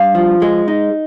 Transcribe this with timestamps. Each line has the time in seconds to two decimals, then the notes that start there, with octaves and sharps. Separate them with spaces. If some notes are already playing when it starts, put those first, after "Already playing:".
Already playing: G2 F5
0.15 F3
0.42 G#3
0.68 D#4